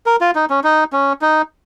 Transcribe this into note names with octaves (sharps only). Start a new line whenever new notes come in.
A#4
F4
D#4
C#4
D#4
C#4
D#4